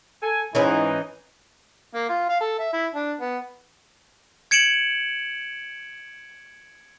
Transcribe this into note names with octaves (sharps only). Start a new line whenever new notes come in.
A4 G#5
G#2 E3 C#4 D#4 E4
A#3
F4
F5
A4
E5
E4
D4
B3
G#6 C#7 D7 E7 F#7